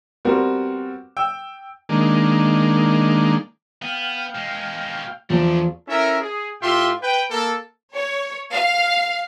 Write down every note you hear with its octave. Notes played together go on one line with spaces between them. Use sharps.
G3 B3 C4 F#4 A#4
G5 E6
D#3 G#3 A#3 D4
B3 F5 G5
B2 G#3
E2 F3 A3 D4
C#4 E4 A4 A#4 E5
G#4
A2 F4 G4 E5 G5 C6
B4 G5
A#3 A4
C#5
F5